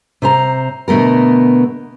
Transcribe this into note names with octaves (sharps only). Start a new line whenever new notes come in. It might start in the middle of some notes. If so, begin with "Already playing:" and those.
C3 C5 A#5
B2 D3 A3 B3 A#4